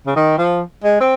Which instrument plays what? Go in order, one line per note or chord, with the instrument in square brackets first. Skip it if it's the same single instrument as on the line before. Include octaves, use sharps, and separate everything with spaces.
[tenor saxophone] C#3
D#3
F3
G#3
C4